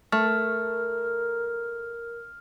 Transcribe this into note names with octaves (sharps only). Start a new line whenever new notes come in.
A3 A#4 F6